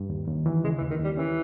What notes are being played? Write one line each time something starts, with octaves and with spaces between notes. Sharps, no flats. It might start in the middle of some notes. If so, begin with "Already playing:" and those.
Already playing: G2
D#2
D#2
E3
C#3 G#3
E3
D#2
D#3
D#2 G3
E3 C#4